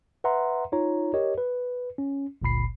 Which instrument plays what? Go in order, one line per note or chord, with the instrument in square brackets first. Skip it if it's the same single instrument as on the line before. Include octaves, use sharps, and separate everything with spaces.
[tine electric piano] B4 E5 F#5 A#5 C6
D#4 F4 C#5 A#5
G4 A#4 C#5 D#5
B4
C#4
G1 C#2 A#2 B5 C7